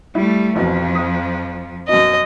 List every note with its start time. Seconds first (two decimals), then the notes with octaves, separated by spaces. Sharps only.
0.15 G3 A3 E4
0.55 A1 F2 B2 F3
0.95 D#6
1.89 F#2 B2 D#5